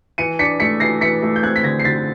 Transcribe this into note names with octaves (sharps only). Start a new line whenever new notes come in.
E3 C#7 D#7
D4 B6 C#7
A3 B6 C#7
E3 A#6 C7
E3 B6 C#7
A3
G6
C4 F#6 G#6
B6
D3 G#6 A#6
C7
D3 A6 B6